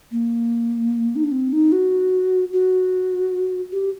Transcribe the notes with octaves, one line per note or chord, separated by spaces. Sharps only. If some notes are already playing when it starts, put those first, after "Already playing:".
A#3
D#4
D4
C4
D#4
F#4
F#4
G4